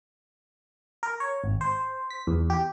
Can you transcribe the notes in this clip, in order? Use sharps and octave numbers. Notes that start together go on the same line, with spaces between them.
A#4
C#5
G#1
C5
B6
E2
G4